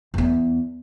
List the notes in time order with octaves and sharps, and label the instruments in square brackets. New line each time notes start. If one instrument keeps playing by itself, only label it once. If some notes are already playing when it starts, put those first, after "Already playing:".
[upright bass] E2 B3